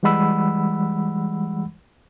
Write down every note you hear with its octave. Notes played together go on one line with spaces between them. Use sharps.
E3 G3 G#3 F#5 B5 E6